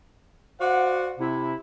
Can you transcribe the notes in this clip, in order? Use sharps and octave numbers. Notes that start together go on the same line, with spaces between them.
F#4 C5 D5 F5 F#5
C3 E4